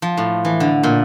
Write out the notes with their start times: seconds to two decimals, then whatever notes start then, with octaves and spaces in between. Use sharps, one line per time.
0.02 F3
0.17 A2
0.45 E3
0.60 D3
0.83 A#2